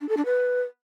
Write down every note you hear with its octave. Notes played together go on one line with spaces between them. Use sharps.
D4
A4
D4
B4